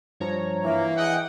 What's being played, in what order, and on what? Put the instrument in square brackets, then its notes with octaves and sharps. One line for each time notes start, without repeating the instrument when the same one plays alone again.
[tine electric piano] G2 F3 [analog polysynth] C#5 A#5
[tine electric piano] E3 [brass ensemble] A#3 [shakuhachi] E5
[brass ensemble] G#4 D#5 F#5 [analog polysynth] G5